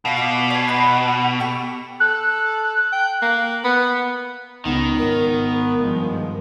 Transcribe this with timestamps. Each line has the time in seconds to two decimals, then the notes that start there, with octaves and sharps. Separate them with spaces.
0.05 B2 F5 B5
0.17 F4 C#6 D6
0.50 D5 G#5
0.68 D#4 B4 B5
1.40 G4 A4 C#6
2.00 A4 F#6
2.92 G5
3.22 A#3
3.64 B3
4.65 C#2 D#3 B3 D#4
4.98 G#1 A#4
5.33 A#4
5.77 G2 F3 G#3